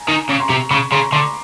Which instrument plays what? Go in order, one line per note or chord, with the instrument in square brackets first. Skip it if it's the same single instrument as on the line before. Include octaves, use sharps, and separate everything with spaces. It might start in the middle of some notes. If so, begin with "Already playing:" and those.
Already playing: [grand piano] G#5 A#5
[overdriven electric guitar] D#3
[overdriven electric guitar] C#3 [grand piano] C#6
[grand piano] A#5 C6
[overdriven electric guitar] C3
[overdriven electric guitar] C#3 [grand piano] B5 C#6
[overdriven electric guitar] C#3 [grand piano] A#5 C6
[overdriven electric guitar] D3 [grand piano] C6 D6